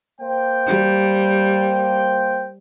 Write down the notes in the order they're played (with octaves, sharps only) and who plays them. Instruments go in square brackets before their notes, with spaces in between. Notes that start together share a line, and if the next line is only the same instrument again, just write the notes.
[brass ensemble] A#3 C5 G5
[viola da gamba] G3